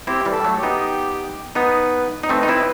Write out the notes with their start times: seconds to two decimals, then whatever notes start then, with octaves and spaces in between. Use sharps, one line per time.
0.07 C4 E4 G4
0.25 E3 G3
0.32 A4
0.44 F#3 A3
0.57 G4
0.63 B3 D#4
1.55 B3 D#4 B4
2.23 D#4
2.29 A3 C4 B4
2.43 D#4
2.48 C4 E4